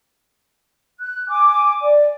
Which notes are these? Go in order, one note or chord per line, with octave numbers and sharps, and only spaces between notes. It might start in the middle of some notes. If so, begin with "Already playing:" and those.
F#6
G#5 D6
D5